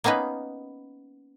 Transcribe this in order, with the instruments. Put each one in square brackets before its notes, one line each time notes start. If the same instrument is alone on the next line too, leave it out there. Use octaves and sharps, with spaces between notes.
[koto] A#3 B3 C#4 D#4 B4